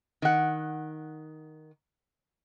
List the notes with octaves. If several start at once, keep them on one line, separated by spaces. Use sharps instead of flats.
D#3 F#5